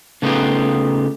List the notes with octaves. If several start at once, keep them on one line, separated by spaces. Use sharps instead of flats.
C#3 A3 B3 D#4 F4 G4